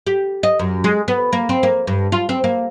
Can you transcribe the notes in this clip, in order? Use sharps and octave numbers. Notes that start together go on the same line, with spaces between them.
G4
D#5
F#2
G#3
B3
A#3
C4
A#3
G2
F4
C4
A#3